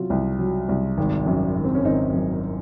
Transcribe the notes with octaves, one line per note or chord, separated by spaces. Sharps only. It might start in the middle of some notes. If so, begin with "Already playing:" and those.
Already playing: C3 F#3 F4
C2
F#3
C2
G#1
F#2
G#1
C4
C#4
G#1 C4 D#4
F#2